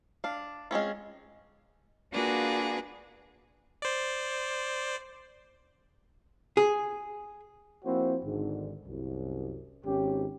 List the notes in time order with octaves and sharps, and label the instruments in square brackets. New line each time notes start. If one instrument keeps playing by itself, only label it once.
[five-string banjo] D4 F5
G#3 C4 C#4 F4
[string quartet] A#3 D4 F4 F#4 G#4 B4
[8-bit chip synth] C5 D5
[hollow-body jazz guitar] G#4
[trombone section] F3 A#3 C4 E4 F#4 C5
G#1 G#2 D3
C2 F#2
G#1 C#4 G4